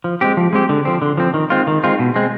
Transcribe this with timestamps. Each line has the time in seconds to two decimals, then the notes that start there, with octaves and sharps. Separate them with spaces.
0.04 F3
0.21 G#3 C4 G4
0.37 F3
0.53 G#3 C4 G4
0.69 D3
0.85 F3 C4
1.02 D3
1.18 F3 C4
1.34 D#3
1.50 G#3 C4 F4
1.67 D#3
1.83 G#3 C4 F4
1.99 B2
2.16 G#3 C4